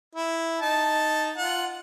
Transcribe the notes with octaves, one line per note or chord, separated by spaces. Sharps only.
E4
D#4 A5
F4 F#5